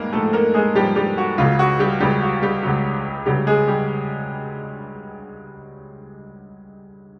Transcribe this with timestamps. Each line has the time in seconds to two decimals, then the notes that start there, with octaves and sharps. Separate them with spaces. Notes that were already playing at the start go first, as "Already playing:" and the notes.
Already playing: G#2 G3 G#3 A#3 G#4 A#4
0.12 G#2 F3 A3 A4
0.33 A#3 A#4
0.54 G#3 G#4
0.75 G#2 F3 G3 G4
0.96 G3 G4
1.18 F#4
1.38 C#2 C#3 F#3 F4
1.59 F#4
1.79 G3 G4
2.00 C#2 C#3 F#3 G3 G4
2.22 F#4
2.42 G3 G4
2.63 C#2 C#3 F#3
3.26 C#2 C#3 F#3 G3 G4
3.47 G#3 G#4
3.68 G3 G4